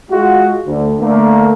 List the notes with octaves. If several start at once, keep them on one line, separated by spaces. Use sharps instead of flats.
G#3 F4 F#4
D2
D3 A3 A#3